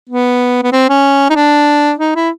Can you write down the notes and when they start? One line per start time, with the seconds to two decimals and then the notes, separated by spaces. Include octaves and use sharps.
0.09 B3
0.63 B3
0.72 C4
0.89 C#4
1.30 D#4
1.35 D4
1.99 D#4
2.15 E4